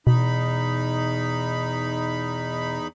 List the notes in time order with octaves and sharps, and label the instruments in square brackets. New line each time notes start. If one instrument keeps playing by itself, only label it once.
[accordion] E2 D#4 B5 [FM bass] B2